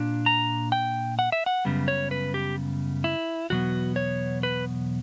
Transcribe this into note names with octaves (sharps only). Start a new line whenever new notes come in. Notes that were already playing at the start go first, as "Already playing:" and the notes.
Already playing: A#2 A#3 D4
A#5
G5
F#5
E5
F#5
F#2 C#3 G3 B3
C#5
B4
G4
E4
E2 B2 F#3 B3 F#4
C#5
B4